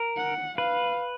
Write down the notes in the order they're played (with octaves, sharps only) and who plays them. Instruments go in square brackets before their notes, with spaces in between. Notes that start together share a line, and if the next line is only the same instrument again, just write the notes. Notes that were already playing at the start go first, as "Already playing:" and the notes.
Already playing: [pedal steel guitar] A#4
[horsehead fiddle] F#5
[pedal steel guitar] B4 [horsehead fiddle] F5